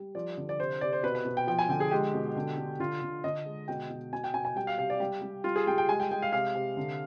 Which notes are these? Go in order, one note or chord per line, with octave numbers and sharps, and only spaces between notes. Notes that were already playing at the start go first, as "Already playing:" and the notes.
Already playing: G3
F3 D5
D3
D5
C3 C5
C3 D5
C5
B2 B4
B4
B2
G5
F3 G5
G#5
D3 G5
G#4
G#3 G4
B2
D3
D3
D3 F4
D3
D3 D#5
G#3
B2 G5
B2
B2 G#5
G5
B2 G#5
G#5
G3 G5
F5
C3 F5
D5
G3 G4
G3
G3 F4
G#4
G3 G5
G5
G#3 G#5
G5
G#3 G5
F5
C3 F5
C3
D3